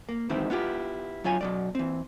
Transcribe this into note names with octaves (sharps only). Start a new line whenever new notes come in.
A#3
G#2 B2 D#3 E3 C4 E4
B3 E4 F4 G4
F#3 F4 C#5 G#5
B2 F#3 D5
E3 C4